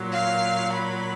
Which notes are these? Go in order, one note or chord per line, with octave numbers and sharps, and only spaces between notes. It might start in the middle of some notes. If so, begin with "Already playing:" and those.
Already playing: A#2 F#3
F5
B5